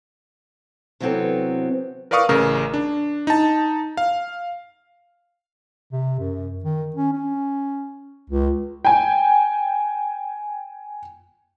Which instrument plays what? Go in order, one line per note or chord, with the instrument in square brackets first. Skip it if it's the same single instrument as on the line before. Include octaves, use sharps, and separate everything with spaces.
[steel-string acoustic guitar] C3 E3 F#3 B3 C4 A4
[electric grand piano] A#4 B4 D5 F5 C#6 D#6
A1 C#3 A#4
D4
D#4 A5
F5
[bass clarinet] C3
F#2
D#3
C#4
C#4
C#2
[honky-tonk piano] G5 G#5